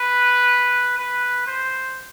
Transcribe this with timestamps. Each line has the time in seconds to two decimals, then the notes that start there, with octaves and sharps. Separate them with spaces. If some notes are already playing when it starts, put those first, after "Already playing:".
Already playing: B4
0.98 B4
1.47 C5